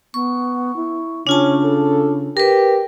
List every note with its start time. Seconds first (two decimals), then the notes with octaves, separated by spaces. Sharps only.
0.14 B3 C#6
0.76 E4
1.27 C#3 C#4 D4 F4 A5
1.63 A4
2.37 G4 A#4 B4